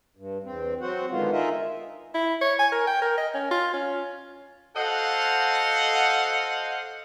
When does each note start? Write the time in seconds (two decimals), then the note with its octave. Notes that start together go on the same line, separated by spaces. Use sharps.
0.16 G2
0.44 E2 C4
0.81 F#3 C4 F#4 C5 F#5
1.11 D3 D#3 G#3 B3 F4
1.32 D#4 F4 G#4 A#4 D#5 E5
2.15 E4
2.41 C#5
2.59 G#5
2.72 A#4
2.87 G5
3.02 A#4
3.18 D#5
3.34 C#4
3.51 F4
3.74 C#4
4.75 F#4 A4 C5 D#5 F5 F#5